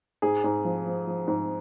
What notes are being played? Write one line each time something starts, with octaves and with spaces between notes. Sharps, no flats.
G#2 G#4
G#2
F3
F3
F3
G#2